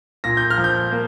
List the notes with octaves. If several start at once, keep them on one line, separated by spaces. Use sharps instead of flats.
A#2 A#6
G6
F6
F3
G6
A#3